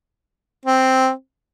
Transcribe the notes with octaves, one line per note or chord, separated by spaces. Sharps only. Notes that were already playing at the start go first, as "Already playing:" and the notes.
C4